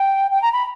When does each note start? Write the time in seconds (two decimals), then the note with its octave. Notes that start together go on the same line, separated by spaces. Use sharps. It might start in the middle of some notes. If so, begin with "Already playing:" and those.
Already playing: G5
0.31 G5
0.42 A#5
0.53 B5